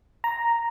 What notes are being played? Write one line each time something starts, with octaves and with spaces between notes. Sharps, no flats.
A#5